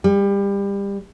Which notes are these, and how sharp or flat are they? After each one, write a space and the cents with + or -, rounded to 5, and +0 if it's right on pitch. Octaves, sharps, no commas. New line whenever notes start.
G3 +25